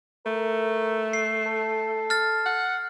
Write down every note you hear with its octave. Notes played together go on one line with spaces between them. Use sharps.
A3 A#4
C7
A4
F6 A6
F#5